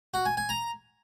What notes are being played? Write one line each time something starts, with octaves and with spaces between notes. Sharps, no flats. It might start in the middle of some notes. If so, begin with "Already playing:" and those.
F#4
G#5
G#5
A#5